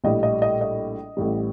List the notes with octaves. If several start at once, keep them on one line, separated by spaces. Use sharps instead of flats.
A#1 A2 G3 D#5
D#5
D#5
D#5
A1 A2 G3